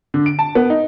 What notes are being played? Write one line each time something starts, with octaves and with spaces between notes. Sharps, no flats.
D3
D7
A5
B3
D#4